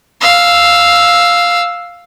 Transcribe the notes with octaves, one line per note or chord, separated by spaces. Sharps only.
F5 E6